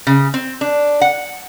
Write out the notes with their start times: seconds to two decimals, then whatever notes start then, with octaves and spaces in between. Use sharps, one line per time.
0.07 C#3
0.34 C4
0.61 D4
1.01 F#5